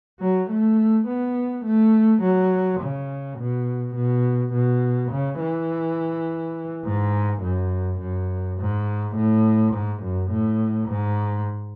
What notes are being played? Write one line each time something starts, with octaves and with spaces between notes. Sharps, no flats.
F#3
A3
B3
A3
F#3
C#3
B2
B2
B2
C#3
E3
G#2
F#2
F#2
G#2
A2
G#2
F#2
A2
G#2